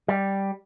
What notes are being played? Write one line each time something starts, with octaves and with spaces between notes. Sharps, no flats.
G3